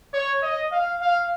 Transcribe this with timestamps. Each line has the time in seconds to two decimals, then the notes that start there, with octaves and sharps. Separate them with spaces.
0.13 C#5
0.43 D#5
0.72 F5
1.02 F5